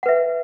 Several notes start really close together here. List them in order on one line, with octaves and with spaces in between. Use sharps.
F#5 B4 E5